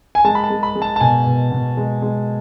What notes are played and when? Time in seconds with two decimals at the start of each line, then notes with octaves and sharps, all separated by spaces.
0.15 G#5
0.25 G#3 A5
0.35 B5
0.44 A5
0.50 G#3
0.63 B5
0.75 G#3
0.82 A5
0.96 A5
1.00 B2 G#5
1.26 B2
1.51 B2
1.77 G#3
2.02 G#3